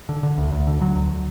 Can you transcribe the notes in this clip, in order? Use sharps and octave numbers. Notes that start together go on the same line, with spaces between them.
D3
D3
D2
D2
D3
D3 F#3
D2